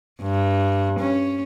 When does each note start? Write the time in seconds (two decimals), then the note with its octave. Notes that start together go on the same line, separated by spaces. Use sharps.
0.22 G2
0.99 C#4